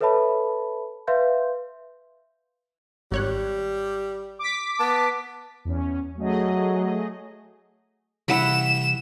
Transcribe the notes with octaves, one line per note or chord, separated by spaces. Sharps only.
A4 B4 C#5 E5 A5 B5
B4 E5 F5 C6 G6
G#1 G3 C#5 F#6
D6 B6
B3 A5
E2 C#4
F#3 A3 G#4 D#5
C3 E3 G3 E4 F#5 B5 E7